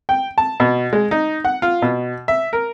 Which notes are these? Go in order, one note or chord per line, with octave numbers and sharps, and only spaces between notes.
G5
A5
B2
G#3
D#4
F#5
F4
B2
E5
A#4